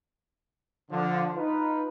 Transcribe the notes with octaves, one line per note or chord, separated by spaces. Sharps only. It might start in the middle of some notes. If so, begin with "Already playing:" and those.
D3 F3
D#4 F4 B4